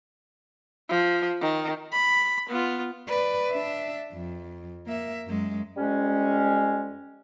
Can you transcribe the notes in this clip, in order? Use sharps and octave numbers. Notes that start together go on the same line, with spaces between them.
F3
D#3
B5
B3 F4
B4 D5
D4 E5
F2
A#3 E5
F#2 G#3
F2 G3 G#3 C#4